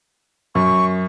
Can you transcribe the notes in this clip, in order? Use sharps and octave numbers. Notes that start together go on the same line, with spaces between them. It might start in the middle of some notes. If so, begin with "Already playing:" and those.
F#2 C#6